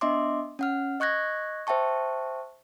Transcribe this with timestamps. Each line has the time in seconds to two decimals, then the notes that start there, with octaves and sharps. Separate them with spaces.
0.01 B3 D4 D#5 E5 C6 D6
0.59 C#4 F#5 F6
1.00 D#5 C#6 F#6 G#6 A#6
1.67 C5 E5 G5 A5 C#6